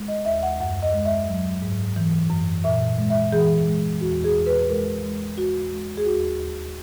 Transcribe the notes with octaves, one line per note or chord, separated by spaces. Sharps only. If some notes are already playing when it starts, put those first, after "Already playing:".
Already playing: G#3
D#5
D#2 E5
F#5
F#2 F#5
D#5
G#3
E5
F#3
G#2
E3
F#2
A#2 E5
G#3
E5
E3 G#4
G#3
E2 F#4
G#4
E2
B4
G#3 A#4
G#3
E2 F#4
G#3
G#4
D#2 F#4